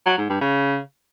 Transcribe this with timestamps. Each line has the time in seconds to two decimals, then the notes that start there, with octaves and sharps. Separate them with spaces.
0.06 F#3
0.18 G#2
0.29 G2
0.41 C#3